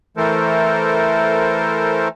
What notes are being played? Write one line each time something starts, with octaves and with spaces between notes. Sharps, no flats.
E3 A3 A4 A#4 C5